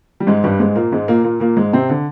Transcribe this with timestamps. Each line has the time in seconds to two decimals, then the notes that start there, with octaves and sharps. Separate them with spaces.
0.20 G3
0.27 G#2 G#3
0.44 G2 G3
0.60 G#2 G#3
0.76 A#2 A#3
0.92 G#2 G#3
1.08 A#2 A#3
1.24 A#2 A#3
1.40 A#2 A#3
1.57 G#2 G#3
1.73 C3 C4
1.89 D3